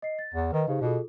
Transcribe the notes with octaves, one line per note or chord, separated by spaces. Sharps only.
D#5 C7
A6
E2
D#3 B4 D#5
C#3 D#4 G4 C5
B2 F4 G#4 A4